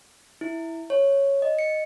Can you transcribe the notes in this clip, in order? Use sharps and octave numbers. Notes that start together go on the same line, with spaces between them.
E4
C#5
D#5
C#7